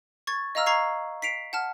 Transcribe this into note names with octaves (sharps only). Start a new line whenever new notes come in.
C#6 G#6 A6
D#5 F5 A#5 E6 F6
A#5 C#6 G#6 C7
B6 C7 D7 F7
F#5 A5 F6